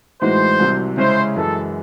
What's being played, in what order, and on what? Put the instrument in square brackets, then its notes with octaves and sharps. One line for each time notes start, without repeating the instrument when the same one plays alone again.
[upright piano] A2 E3 G#3 D#4 F#4 [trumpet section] C5
[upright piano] C2 C3 F#3
[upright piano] C#3 G#3 C#4 E4 [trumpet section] C5
[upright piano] F#2 E3 G#3 [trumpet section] A4